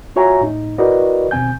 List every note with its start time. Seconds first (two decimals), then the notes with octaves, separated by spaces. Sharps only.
0.16 F4 F#4 C#5 E5 G#5 A#5
0.41 A2 D#4
0.78 E4 F#4 A#4 B4 D5 D#5
1.31 D#2 B2 C4 G#5 G6